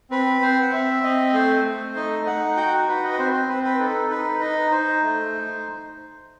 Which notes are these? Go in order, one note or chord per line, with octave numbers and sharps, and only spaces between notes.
C4 B4
C4 C5
F#5
C4 E5
C4 D#5
A3 C5
A3
D#4 D#5
D#4 F#5
F#4 G5
F#4 B4
D#5
B4
C4 C5
C5
C4 B4
B4
D#4 A4
D#4 B4
D#4 D#5
D#4 C5
A3
D#4